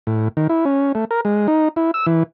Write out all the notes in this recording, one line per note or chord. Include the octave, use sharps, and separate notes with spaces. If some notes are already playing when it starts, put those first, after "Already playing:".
A2
D#3
E4
C#4
A3
A#4
G#3
D#4
E4
E6
E3